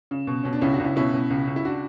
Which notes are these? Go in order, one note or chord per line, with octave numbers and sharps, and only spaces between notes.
C#3
B2
B2 C#4
D4
C#2 C#4 E4
D4 F#4
C#2
C#4 E4
B2 C#4 E4
B2
C#2
C#2
E4
D4 F#4